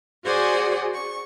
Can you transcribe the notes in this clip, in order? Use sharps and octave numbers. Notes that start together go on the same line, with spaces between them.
F#4 G#4 C5 D5 F#5 G#5
C#6